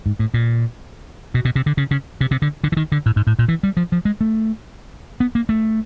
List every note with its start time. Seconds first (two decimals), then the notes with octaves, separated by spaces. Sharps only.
0.06 G#2
0.19 A2
0.34 A#2
1.34 B2
1.45 B2
1.56 C3
1.66 D3
1.77 C#3
1.91 C#3
2.21 C3
2.31 C3
2.42 D3
2.64 D3
2.72 E3
2.77 D#3
2.92 D3
3.06 A2
3.16 G#2
3.27 A2
3.39 A#2
3.48 E3
3.63 G3
3.77 F3
3.92 F3
4.05 G#3
4.21 A3
5.20 B3
5.35 A#3
5.49 A3